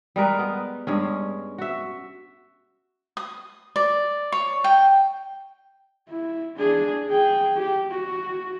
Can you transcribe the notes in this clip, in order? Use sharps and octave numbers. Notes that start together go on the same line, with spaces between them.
G3 G#3 A#4 B4
B3
G2 G#3 C#4
F#4 E5
D#6
D5
C#5
G5
E4
D4 G#4
G#4 G5
G4
F#4